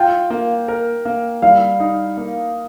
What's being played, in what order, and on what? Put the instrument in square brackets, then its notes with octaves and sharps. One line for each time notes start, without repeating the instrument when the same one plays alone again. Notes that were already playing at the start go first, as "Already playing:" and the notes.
Already playing: [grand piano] F4 [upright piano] G5
[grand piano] A#3
A#4
A#3
[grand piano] G3 [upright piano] F5
[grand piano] D#4
A#3